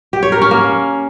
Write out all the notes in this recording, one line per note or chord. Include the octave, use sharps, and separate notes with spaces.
G4
C#5
A#4
C#4
A#3